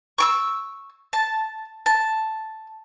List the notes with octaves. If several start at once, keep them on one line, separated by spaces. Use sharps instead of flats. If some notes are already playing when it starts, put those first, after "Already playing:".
C#6 D6 E6
A5
A5